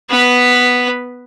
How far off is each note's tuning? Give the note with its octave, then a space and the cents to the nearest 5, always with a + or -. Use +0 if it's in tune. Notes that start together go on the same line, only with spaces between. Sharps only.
B3 +0 B4 +0